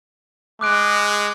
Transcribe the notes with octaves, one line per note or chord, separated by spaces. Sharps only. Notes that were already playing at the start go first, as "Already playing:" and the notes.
G#3 D6 F#6 D7